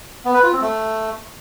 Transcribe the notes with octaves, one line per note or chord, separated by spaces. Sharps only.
B3
B4
F4
C4
A3